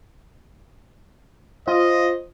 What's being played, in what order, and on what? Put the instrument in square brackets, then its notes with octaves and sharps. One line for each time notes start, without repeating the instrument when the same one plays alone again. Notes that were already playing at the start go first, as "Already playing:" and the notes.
[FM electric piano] F4 [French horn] C5 [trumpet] D#5